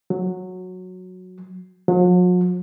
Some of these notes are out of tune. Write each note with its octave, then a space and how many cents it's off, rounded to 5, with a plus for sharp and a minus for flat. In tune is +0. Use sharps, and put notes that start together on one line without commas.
F#3 -10
F#3 -45